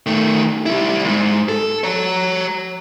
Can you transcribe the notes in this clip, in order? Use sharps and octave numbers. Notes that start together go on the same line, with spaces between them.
D#3 A3
G3 E4
D2 G#2
A4
C#5 A#5